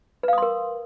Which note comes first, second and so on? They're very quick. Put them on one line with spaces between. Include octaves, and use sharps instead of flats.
B4 F5 D#6 C6 A#4